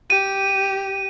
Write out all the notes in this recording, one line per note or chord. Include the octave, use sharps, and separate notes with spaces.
G4 D#7